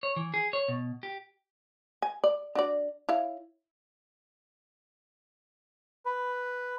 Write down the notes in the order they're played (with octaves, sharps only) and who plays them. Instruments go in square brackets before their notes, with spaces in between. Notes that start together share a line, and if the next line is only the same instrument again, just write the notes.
[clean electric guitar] C#5
E3
G#4
C#5
B2
G4
[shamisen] G#5
D5
D4 F#4 D5
E4 C#5 F5
[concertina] B4